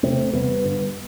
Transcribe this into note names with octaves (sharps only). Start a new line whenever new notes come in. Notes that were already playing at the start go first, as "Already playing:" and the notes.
E2 C3 A3 C4
E2 C3 G3 B3
G2 D3